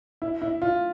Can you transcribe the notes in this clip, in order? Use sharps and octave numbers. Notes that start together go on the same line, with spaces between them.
E4
E4
F4